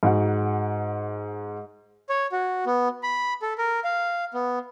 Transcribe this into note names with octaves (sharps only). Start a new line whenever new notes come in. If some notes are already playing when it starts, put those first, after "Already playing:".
G#2 F#4 F#5
C#5
F#4
B3
B5
A4
A#4
F5
B3